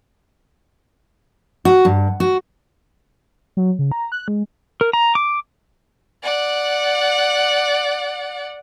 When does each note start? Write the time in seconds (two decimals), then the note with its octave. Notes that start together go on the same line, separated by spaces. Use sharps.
1.65 F#4
1.85 G2
2.20 F#4
3.57 F#3
3.79 C#3
3.92 A#5
4.12 F#6
4.28 G#3
4.81 A#4
4.93 A#5
5.15 D6
6.23 D5 F#5